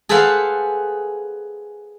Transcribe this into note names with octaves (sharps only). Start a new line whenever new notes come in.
G#4 A4 B4 C5 F5 F#5